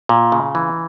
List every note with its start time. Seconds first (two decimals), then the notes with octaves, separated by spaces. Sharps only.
0.09 A#2
0.32 C#3
0.55 E3